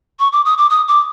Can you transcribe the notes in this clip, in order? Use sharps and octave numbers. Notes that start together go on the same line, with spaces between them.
C#6
D6
D#6
D6
D#6
D6